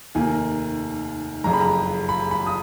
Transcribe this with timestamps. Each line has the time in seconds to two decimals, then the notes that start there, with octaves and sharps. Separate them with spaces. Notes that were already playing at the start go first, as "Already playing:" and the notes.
0.15 F1 D#2 D#3 A#3 G#5
1.44 F#1 F2 C#3 A#5
1.53 B5
1.61 A#5
2.09 B5
2.31 B5
2.46 D#6